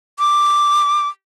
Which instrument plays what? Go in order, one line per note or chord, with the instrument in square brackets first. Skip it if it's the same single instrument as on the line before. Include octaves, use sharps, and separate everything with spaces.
[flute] D6